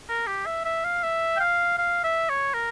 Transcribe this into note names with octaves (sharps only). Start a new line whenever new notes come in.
A#4
G4
E5
E5
F5
E5
G5
F5
F5
E5
C#5
A#4